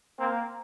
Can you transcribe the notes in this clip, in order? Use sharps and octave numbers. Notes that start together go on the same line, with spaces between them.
A#3 C4